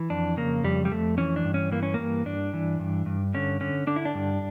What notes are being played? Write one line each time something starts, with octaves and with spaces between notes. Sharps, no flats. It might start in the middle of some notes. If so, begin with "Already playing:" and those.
Already playing: E3
F2 D4
C#3 A#3
F2 G3
G3
F2 A3
E3 C#4
D4
G2
C#4
E3 A#3
C#4
G2 A#3
G2 D4
E3
G2
G2
D3 C#4
D3 C#4
D3 D4
E4
D4
G2